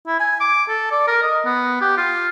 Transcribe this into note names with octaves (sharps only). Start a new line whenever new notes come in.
E4
G#5
D6
A4
D5
A#4
D#5
B3
G4
F4